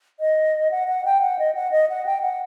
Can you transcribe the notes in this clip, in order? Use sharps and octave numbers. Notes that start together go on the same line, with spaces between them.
D#5
F#5
F#5
G5
F#5
D#5
F#5
D#5
F#5
G5
F#5